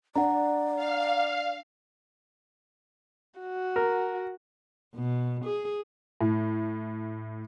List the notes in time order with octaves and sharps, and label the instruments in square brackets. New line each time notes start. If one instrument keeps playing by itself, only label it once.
[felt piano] D4 [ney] D5 [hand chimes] F#5 A#5
[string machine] F5
[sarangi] F#4
[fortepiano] A#4
[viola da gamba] B2
G#4
[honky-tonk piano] A2